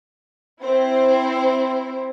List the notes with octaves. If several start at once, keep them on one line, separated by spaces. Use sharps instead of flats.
C4 E4 C5